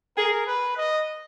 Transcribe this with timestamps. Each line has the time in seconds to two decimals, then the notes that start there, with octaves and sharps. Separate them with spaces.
0.17 G#4 A#4
0.47 B4
0.77 D#5